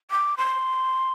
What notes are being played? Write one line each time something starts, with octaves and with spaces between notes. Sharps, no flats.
D6
C6